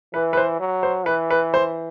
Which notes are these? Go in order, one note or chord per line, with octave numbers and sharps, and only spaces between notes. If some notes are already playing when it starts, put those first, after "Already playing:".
E3 B4
B4
C5
F#3
C5
E3 B4
B4
C5